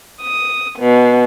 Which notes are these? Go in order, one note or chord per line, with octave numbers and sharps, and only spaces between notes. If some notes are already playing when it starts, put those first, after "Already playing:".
D#6
B2